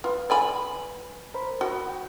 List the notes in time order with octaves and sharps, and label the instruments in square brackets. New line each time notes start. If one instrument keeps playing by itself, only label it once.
[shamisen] F4 [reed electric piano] B4
[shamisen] D5 G#5 B5
[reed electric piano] A#4 C5 B5
[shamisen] F#4
[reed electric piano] G5